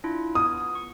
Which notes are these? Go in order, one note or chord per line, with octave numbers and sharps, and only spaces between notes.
D4 E4 F4
B3 D#6
C#6